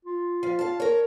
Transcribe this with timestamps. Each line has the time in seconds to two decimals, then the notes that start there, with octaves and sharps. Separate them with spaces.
0.05 F4
0.43 F3 F5
0.59 F5 A5
0.80 A#4 C#5